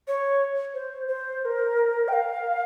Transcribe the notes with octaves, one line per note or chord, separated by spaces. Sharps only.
C#5
C5
C5
C5
A#4
G5
F5